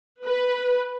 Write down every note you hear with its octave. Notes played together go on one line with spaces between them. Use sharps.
B4